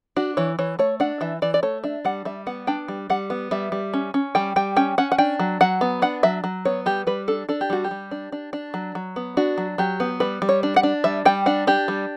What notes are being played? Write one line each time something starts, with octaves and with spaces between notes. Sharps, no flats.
D4 F#4
E3 C#5
E3 C#5
A3 C#5
D4 F#5
E3 E5
E3 D5
D5
A3 C#5
D4 E5
G3 F#5
G3 E5
B3 F#5
D4 G5
G3
G3 F#5
B3
G3 E5
G3
C#4
C#4
G3 G5
G3 G5
C#4 G5
C#4 F#5
F#5
D4 G5
F#3
F#3 F#5
B3
D4 F#5
F#3 E5
F#3
B3 C#5
G3 G4
G3 B4
D4 A4
D4 A4
G4
G3 F#4
G4
G3
D4
D4
D4
F#3
F#3
B3
D4 F#4
F#3
F#3 G4
B3
G3 B4
G3
C#5
D4
F#5
D4
G3 E5
G3 G5
D4 F#5
D4 G4
G3